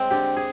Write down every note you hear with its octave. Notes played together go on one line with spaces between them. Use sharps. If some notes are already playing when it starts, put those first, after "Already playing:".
Already playing: G#3 C4
D3 G4
G#4